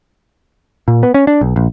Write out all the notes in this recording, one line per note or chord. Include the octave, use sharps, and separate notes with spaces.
A#2
B3
C#4
D4
B1
A#1